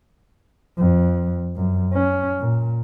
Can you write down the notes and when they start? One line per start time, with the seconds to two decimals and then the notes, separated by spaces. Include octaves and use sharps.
0.78 F2
1.56 F#2
1.94 C#4
2.40 A#2